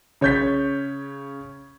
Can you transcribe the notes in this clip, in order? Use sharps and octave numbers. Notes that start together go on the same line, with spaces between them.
C#3 C#5 C#6 G6 A6 B6